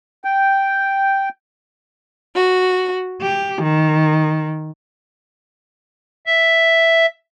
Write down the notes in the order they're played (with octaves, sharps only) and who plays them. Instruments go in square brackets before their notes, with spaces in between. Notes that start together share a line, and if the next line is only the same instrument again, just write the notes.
[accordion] G5
[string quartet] F#4
G4
D#3
[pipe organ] E5